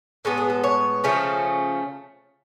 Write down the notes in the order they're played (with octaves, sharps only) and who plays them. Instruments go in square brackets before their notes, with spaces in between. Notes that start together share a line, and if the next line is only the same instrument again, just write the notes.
[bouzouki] A2 G#3 B3 A4
G#4
A4
C#5
C#3 F3 A3 C#4